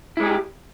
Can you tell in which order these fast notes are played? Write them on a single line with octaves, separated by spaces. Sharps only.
E4 G#3 G#4 G4